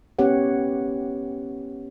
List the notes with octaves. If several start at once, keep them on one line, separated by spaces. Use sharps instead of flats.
B3 C#4 G4 C#5 F#5